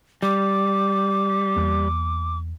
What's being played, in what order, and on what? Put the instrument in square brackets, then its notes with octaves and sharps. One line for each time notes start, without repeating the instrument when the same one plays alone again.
[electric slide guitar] G3 [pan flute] D6
[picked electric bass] E2 A#3